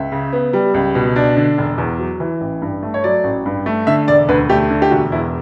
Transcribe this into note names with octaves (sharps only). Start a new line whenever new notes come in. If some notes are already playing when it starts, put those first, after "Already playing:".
Already playing: C#2 E5
C#3
B3
G3
C#2
B2
D4
D3
E1
E2
F#3
E3
A1
G2
A3
C#5
F#3 D5
A1
G2
A3
D3 E5
E1 D5
D2 B4
A3 G4
D3
G4
E1 F#4
E2 E4